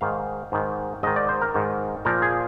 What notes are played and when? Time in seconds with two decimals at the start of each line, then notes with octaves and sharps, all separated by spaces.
0.01 G#2 D#3 F5
0.52 G#2 D#3
1.03 G#2 D#3 D#5
1.16 D5
1.29 C5
1.42 A#4
1.54 G#2 D#3
2.05 A#2 F3 A#4
2.22 G#4